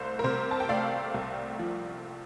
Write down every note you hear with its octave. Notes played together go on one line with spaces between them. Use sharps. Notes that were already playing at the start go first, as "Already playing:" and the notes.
Already playing: C2 A3 C5 F5
A#4
C3 C5
A5
G5
A3 D5 F5
C2
F3